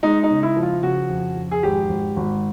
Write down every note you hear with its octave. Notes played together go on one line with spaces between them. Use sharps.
G#3 D#4
D#4
C#3
E4
F3
F4
C#3 F#4
F2
F2
G#4
G#1 G4
G#1
G#1